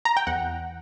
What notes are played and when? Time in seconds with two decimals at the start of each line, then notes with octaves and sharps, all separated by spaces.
0.05 A#5
0.17 G5
0.27 E2 F#5